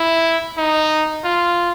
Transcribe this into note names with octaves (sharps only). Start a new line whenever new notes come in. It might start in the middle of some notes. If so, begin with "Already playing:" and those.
Already playing: E4
D#4
F4